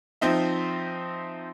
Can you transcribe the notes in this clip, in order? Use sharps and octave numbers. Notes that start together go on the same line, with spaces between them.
F3 C4 D#4 E5